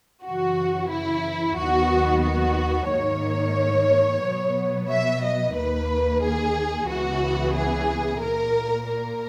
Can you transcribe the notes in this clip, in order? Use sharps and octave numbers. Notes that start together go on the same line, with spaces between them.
F#2 C#3 E3 F#4
E4
D#2 D#3 F#3 B3 F#4
F#4
G#2 D#3 A#3 C#5
B2 F#3 B3
E5
D#5
D#2 D#3 A#3 B4
G#4
C#2 C#3 E3 B3 F#4
G#4
A#2 A#3 A#4
A#4